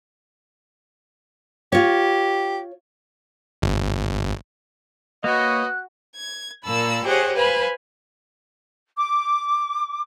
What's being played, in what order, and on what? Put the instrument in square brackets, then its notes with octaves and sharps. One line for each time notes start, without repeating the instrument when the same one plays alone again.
[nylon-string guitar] F4 C#5 [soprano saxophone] G4
[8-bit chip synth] G1
[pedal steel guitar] A#3 C#5 [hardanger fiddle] F#4 [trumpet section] B4 D#5 [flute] F#6
[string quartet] G#6
A#2 A#3 A5 B5 E6
G4 G#4 C5 C#5 D#5 F#5
B4 C5 F5 G#5 B5
[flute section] D6